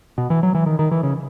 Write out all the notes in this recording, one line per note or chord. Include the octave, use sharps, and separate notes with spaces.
B2
E3
F#3
E3
D#3
D#3
E3
C#3